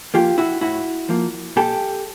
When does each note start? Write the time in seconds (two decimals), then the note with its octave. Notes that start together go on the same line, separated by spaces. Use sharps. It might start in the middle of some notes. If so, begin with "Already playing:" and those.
0.14 F3 A#3 F4 G4
0.38 E4 F#4
0.61 A2 E4 F#4
1.09 F3 A#3
1.56 A#2 G4 A4